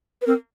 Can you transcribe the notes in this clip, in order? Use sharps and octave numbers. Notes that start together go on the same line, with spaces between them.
B4
C4 A#4